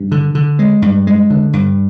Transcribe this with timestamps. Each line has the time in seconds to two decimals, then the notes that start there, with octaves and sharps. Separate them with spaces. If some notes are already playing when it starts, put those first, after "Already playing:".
Already playing: G2
0.12 D3
0.35 D3
0.59 G#3
0.82 G2
1.07 G#3
1.30 D3
1.53 G2